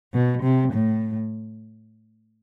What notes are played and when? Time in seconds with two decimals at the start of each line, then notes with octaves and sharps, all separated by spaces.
0.14 B2
0.43 C3
0.73 A2